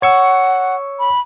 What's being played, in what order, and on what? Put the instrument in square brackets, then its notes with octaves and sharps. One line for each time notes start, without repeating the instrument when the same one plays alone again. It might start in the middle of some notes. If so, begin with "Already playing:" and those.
[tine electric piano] C#5 C#6 E6 [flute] F#5
[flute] B5